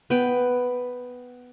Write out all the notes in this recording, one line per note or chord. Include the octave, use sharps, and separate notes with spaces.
B3 G5